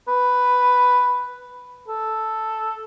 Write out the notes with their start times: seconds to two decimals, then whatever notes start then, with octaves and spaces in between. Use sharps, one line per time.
0.08 B4
1.88 A4